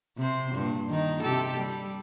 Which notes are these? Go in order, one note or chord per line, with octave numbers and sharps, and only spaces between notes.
C3 C5
G2 A#2
D#3 D#4
C3 G4 A4
G3